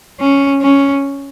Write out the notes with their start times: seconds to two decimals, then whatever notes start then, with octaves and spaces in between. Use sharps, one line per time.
0.20 C#4
0.62 C#4